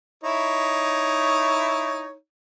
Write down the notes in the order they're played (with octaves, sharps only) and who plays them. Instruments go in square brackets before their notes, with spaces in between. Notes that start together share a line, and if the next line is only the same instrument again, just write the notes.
[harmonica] D#4 E4 C#5